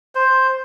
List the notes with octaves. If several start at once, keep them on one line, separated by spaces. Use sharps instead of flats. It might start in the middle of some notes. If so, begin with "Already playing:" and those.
C5